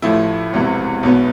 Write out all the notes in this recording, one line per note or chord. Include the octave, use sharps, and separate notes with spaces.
A1 A2 F3 A3 E4
E1 E2 C3 E3
B1 B2 B3